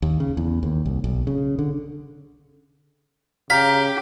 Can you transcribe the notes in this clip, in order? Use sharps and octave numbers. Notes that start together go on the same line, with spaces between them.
D#2
C#3
E2
D#2
C2
B1
C#3
D3
C#3 G4 F5 A#5 B6